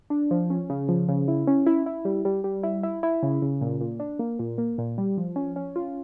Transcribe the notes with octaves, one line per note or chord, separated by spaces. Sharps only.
D4
F3
C#4
C#3
F3
C#3
E4
C#4
E4
E4
G3
G3
G3
E4
E4
E4
C#3
C#3
A#2
A#2
D4
A#3
A#2
A#3
A#2
G3
F3
C#4
C#4
F4